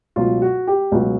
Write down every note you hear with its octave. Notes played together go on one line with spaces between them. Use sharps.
C#2 B2 F#3 F4
F#4
G4
C#2 B2 F#3